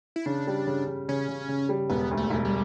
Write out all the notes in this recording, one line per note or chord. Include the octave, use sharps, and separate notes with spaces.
E4
C#3 D4
G3
C#3
C#3
C#3 C#4
C#3
C#3
G3
E1 B3
D2
A3
E1
G3